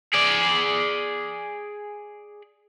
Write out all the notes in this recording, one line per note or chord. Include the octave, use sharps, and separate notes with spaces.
G#4 D5